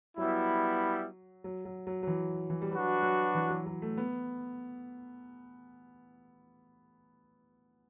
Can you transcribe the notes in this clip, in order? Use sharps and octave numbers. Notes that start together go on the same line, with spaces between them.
F#3 G3 B3 E4
F#3
F#3
F#3
F#3
E3
E3
G3
F#3 D4 F#4 B4
F#3
E3
F#3
F#3
A3
B3